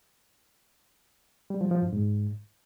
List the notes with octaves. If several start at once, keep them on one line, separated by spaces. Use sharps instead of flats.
G3
F3
F3
G2
G#2